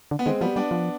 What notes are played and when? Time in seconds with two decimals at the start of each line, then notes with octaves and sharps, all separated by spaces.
0.11 D3
0.19 B3
0.26 D#3 G#3 C4
0.41 F3 G3 B3
0.56 G3 B3 D4
0.71 F3